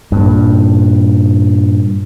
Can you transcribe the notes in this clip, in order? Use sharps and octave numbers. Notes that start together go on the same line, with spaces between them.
G2 A#2